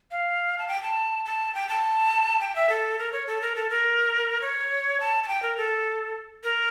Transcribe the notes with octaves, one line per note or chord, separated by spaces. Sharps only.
F5
A5
G5
A5
A5
G5
A5
G5
E5
A4
A#4
C#5
A4
A#4
A4
A#4
C#5
A5
A5
G5
A#4
A4
A#4